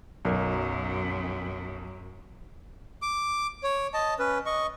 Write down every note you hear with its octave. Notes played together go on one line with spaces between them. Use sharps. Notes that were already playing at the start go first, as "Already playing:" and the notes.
B1 F#2 A#4
D6
C#5
D#5 A5
C#4 B4
D#5 C#6